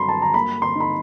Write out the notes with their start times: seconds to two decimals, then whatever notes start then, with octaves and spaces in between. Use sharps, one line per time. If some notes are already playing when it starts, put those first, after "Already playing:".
Already playing: G2 F#3 B5 C6
0.09 A5
0.22 A#5
0.34 A#3 B5
0.62 C6
0.75 D#4
0.80 B5